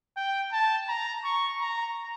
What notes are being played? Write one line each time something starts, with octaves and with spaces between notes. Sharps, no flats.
G5
A5
A#5
C#6
A#5